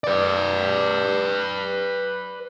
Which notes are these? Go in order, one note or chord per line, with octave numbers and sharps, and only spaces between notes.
B4 D5